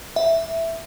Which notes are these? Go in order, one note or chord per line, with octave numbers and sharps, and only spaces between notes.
E5